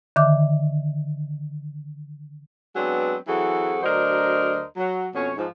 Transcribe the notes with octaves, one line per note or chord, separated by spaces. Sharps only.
D3 D#3 E5 D6
F#3 G#3 B3 C4 D4 B4
E3 F#3 C4 F#4 G#4 A4
D2 F#3 D4 A#4 C5 D#5
F#3
F2 B2 C#4 C#5
G#2 F3